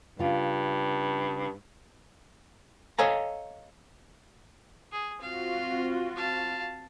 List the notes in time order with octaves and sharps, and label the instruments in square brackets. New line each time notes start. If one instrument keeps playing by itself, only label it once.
[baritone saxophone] G2 [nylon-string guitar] C#3 F4
[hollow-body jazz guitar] A4 C#5 D#5 F5 G#5 A#5
[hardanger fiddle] G#4
[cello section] C4 F4 F#4 [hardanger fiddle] F5
[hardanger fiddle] F5 A5